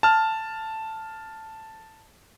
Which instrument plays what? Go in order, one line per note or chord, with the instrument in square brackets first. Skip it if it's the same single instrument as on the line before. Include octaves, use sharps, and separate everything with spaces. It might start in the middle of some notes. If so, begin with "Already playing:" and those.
[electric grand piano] A5 F6